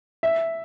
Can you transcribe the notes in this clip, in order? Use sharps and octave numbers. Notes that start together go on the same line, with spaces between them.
E5